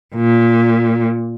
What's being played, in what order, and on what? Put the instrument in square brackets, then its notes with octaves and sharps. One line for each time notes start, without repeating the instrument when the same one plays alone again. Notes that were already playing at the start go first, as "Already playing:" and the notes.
[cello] A#2